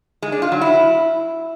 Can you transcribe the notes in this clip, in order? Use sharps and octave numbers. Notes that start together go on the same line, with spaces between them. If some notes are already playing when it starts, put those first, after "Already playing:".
G#3
D4
F4
F#3
E4